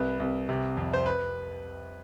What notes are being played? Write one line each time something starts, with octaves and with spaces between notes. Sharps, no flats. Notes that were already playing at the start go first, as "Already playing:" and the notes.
Already playing: C2 B4
C2
C3
F2
C5
B4